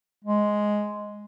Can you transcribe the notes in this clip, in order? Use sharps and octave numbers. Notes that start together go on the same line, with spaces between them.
G#3